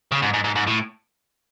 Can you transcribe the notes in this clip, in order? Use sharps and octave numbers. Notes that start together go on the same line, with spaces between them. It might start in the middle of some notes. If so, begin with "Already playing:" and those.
C#3
G#2
G#2
G#2
G#2
A2